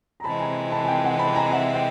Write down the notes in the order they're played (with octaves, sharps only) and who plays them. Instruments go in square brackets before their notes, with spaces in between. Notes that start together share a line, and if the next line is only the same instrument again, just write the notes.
[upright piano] A#5
[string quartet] C3 E3 G#3 C4 [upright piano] A5 B5
[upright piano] G#5 A#5
A5 B5
G#5
G5 A5
F#5 G#5
A5 B5
G#5 A#5
E5 F#5
G5